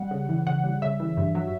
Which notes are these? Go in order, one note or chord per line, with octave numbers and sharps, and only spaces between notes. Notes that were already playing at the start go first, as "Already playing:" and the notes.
Already playing: G3 F#5
C#3
E3
C#3 F#5
G3
C#3 E5
E3
G2
F#3